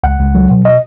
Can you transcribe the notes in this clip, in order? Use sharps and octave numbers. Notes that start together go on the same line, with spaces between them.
C#2 F#5
C#2
F#3
B2
D#5